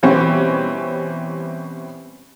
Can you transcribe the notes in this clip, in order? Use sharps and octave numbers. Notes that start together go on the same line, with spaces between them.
B2 E3 G3 C4 C#4